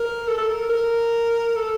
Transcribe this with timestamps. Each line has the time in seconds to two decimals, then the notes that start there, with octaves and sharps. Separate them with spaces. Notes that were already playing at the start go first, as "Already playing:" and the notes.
Already playing: A#4
0.27 A4
0.38 A4
0.49 A#4
0.70 A#4
1.56 A4